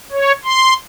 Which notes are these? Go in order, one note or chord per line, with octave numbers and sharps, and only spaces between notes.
C#5
C6